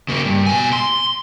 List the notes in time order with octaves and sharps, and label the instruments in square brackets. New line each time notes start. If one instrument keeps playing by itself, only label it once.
[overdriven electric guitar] C#3 A#3
G2
B2 G#5
C6